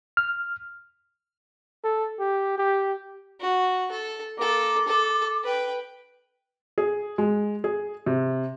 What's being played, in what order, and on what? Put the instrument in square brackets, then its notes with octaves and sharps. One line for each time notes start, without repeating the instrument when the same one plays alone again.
[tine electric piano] F6
[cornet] A4
G4
G4
[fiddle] F#4
A4
[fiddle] A#3 A4 [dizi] D6
[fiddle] A4
B4 G5
[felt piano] G#4
G#3
G#4
C3